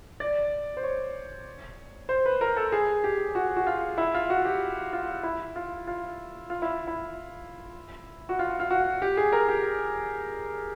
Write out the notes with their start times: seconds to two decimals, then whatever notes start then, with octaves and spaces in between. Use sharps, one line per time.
0.20 D5
0.77 C5
0.83 C#5
2.09 C5
2.26 B4
2.41 A#4
2.56 A4
2.72 G#4
3.04 G4
3.35 F#4
3.56 F#4
3.67 F4
3.98 E4
4.14 F4
4.30 F#4
4.45 G4
4.93 F4
5.23 E4
5.56 F4
5.87 F4
6.50 F4
6.62 E4
6.87 E4
8.29 F#4
8.39 F4
8.60 F4
8.70 F#4
9.02 G4
9.17 G#4
9.32 A#4
9.48 G4